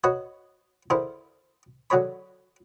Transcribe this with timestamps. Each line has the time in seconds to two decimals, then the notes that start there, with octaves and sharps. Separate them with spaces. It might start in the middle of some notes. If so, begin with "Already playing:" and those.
0.04 F#4 B4 C#5 D#5
0.90 D3 E4 G#4 A#4 C5
1.90 D3 F#3 G#4 C#5 B5